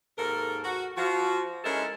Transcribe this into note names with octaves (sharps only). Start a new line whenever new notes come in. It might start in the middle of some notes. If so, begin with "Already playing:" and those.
D#2 G#2 A4 A#4
F#4
F3 F#4
G#3 C#4 D#4 E4 A4 A#4